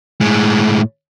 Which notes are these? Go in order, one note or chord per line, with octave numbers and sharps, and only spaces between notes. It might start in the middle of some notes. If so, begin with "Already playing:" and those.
A2 G#3